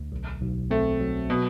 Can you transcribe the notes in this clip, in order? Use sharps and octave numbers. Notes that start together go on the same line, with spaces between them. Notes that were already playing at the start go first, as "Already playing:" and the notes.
Already playing: D2
B1
B1
A3 C4
F#3
B2 B3